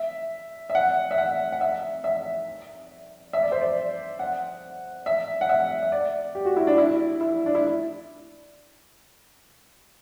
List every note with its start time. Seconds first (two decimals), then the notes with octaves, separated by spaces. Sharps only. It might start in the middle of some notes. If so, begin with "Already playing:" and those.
Already playing: E5
0.70 E5
0.75 F#5
1.11 E5
1.18 F#5
1.52 F#5
1.61 E5
2.04 E5
3.33 E5
3.43 D5
3.52 C5
3.61 D5
4.19 F#5
5.06 E5
5.41 F#5
5.49 E5
5.83 E5
5.92 D5
6.35 G4
6.46 F#4
6.57 E4
6.67 D4
6.78 E4
7.21 E4
7.46 D4
7.55 E4